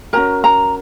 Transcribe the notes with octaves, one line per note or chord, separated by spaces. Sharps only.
C#4 F#4 A#4 A#5
A#5